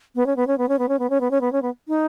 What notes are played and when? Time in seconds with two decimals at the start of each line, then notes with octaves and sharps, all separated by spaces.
0.15 B3
0.26 C#4
0.36 B3
0.47 C#4
0.58 B3
0.69 C#4
0.79 B3
0.88 C#4
0.99 B3
1.10 C#4
1.21 B3
1.31 C#4
1.41 B3
1.52 C#4
1.62 B3
1.88 D#4